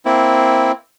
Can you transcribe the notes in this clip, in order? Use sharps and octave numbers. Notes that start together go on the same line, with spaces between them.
A#3 C4 E4